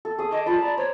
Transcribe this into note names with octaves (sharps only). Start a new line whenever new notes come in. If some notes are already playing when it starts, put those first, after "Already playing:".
A4
G#4 D#6
D#5 G#5 D6 E6
F4 D5 A5 B5
D5 A#5
C5 C#5